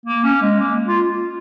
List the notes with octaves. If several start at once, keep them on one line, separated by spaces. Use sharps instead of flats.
A#3
C#4
G#3
A#3
F4